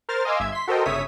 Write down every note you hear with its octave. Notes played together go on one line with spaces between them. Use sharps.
A#4 C5 F6 A6
D#5 F5 G#5 C6 D6 E6
G1 E5 G#6
C6 B6
F#4 A4 A#4 C5 D#5 G5
G1 C#3 C#5 E5 D#6 B6